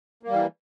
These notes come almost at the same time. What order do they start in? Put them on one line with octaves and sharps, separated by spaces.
A#3 G3 E3